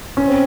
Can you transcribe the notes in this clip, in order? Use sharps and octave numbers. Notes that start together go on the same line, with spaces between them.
C#4
C4